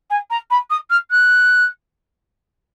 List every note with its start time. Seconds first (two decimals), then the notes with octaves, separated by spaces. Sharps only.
0.10 G#5
0.30 A#5
0.51 B5
0.70 D#6
0.90 F6
1.11 F#6